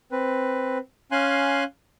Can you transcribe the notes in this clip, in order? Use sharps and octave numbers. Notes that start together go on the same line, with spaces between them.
C4 B4
C#4 F5 G#5 C6 F#6